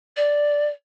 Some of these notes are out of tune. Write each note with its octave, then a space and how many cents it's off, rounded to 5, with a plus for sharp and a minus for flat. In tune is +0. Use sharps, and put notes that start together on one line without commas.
D5 -5